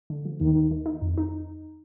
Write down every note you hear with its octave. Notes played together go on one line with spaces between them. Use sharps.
D3
F3
D#2 D#3
D#2
D#3
D#4
F2
D#4